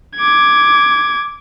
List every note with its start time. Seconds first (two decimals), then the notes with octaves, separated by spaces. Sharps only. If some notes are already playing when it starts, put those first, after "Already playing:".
0.16 D6 G#6